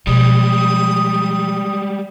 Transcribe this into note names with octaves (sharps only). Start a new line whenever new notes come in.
B2 F3 G3 G#3 D#6